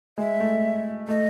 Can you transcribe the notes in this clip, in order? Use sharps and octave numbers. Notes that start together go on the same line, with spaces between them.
G#3 E5
A3
A3 D#5